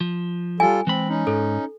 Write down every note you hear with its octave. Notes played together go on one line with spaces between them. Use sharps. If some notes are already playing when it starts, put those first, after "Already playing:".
F3
G3 F4 A4 G#5
E3 G#3 C4 B5
C#4 D#4
G#2 A4